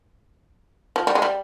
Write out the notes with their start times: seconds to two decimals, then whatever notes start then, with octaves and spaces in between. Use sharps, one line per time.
0.96 F3
1.07 G3
1.15 G#3
1.22 G3